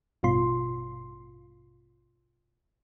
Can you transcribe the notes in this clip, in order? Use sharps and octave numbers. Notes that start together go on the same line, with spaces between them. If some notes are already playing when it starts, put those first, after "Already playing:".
A1 G2 B2 F4 C6